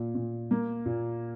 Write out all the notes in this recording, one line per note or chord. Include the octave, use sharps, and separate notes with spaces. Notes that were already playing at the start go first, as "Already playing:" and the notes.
Already playing: A#2
A#2
A#3
A#2